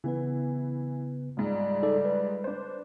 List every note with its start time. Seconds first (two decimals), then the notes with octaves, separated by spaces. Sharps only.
0.04 C#3 E3 B3 B4
1.37 C#2 G#2 G3
1.83 D#4 A4 D5
2.05 B4
2.44 D4 C5